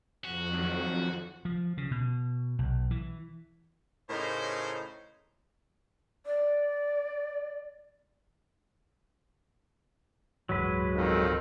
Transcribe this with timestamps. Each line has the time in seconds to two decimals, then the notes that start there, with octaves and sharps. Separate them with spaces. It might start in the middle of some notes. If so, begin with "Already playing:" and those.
0.25 F2 F#4
0.53 D#3 F3 F#3
1.45 F3
1.77 C#3
1.91 B2
2.59 B1
2.91 E3
4.10 A2 C#3 D#4 A#4 C5
6.26 D5
10.49 D1 G2 E3 F#3 G#3 B4
10.95 B1 F2 D#3